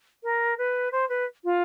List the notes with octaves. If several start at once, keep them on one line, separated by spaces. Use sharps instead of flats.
A#4
B4
C5
B4
F4